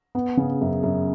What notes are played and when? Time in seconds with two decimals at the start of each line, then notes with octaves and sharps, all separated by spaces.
0.15 B3
0.37 C#3
0.61 F#2
0.83 F#2